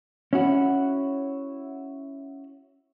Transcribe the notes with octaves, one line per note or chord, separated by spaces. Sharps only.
C#4 E4 F#4